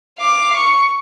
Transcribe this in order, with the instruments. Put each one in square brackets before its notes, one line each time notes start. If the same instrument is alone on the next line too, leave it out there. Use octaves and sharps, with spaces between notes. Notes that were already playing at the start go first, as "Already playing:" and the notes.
[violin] F5 D6
C#6